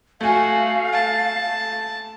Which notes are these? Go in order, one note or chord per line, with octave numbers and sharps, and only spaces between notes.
A3 F#4 F5 G#5
A5